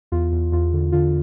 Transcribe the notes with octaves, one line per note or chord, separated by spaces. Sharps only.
E2 F4
E2
E2 F4
D3
D3 F4